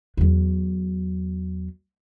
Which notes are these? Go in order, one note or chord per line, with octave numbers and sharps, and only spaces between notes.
E2 F#3